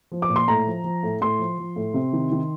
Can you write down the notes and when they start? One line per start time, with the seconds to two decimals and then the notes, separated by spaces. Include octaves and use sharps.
0.12 F3
0.22 D6
0.29 A#2
0.36 C6
0.48 A2 A#5
0.67 F3
0.84 F3
1.03 A2
1.21 A2 C6
1.39 F3
1.58 F3
1.76 A2
1.94 C3
2.13 D#3
2.32 D#3